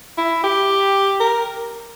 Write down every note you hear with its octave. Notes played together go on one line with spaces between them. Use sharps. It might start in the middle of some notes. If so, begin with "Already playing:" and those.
E4
G4
A#4